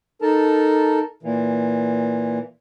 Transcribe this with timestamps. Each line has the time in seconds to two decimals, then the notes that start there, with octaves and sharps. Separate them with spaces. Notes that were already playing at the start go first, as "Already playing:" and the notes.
0.22 D#4 A4 A#4 A5
1.23 A#2 E3